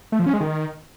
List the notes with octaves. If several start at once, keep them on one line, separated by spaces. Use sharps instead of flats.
A3
F3
C#4
G#3
D#3